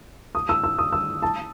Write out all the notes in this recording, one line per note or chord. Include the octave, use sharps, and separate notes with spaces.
D#6
E6
E6
D#6
E6
A5